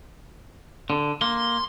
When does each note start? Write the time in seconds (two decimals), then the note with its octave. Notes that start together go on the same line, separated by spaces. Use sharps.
0.90 D3
1.21 A#3 C6